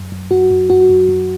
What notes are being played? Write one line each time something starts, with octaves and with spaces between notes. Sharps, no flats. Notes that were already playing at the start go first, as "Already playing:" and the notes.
Already playing: F#2
F#2
F#2 F#4
F#2
F#2 F#4
F#2
F#2